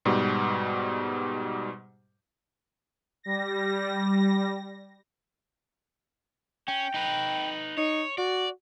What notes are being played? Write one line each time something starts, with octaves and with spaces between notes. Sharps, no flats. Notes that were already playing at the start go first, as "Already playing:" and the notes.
G#2 B2 G3
G3 A#6
C#4 G5
D#4 B4
D#4 C#5
F#4 D5